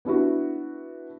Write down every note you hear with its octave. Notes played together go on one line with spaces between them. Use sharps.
B3 D4 E4 F#4